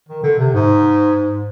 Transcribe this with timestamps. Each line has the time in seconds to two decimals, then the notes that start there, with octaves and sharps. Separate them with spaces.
0.08 D#3
0.23 D3
0.39 C3
0.54 G#2